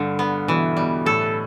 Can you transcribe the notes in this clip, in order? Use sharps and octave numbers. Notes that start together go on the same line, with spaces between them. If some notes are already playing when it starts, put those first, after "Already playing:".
Already playing: G2 D3 G3
B3
B2 E3
B2 G3
A2 A4